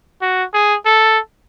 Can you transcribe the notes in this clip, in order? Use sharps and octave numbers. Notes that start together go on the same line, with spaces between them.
F#4
G#4
A4